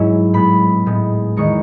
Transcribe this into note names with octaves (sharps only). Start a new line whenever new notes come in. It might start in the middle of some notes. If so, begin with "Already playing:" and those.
Already playing: G#2 F#3 C#4 E4
A2 G#3 B3 B5
A2 G#3 B3
E2 D#3 G#3 D#4 C#6